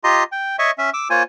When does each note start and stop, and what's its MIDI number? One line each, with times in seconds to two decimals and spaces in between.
0.04 0.23 65
0.04 0.23 67
0.04 0.23 75
0.04 0.23 82
0.04 0.23 84
0.32 0.56 79
0.59 0.71 73
0.59 0.71 75
0.59 0.71 76
0.59 0.71 85
0.78 0.90 61
0.78 0.90 76
0.93 1.08 86
0.93 1.08 88
1.10 1.23 58
1.10 1.23 65
1.10 1.23 72
1.10 1.23 73
1.10 1.23 80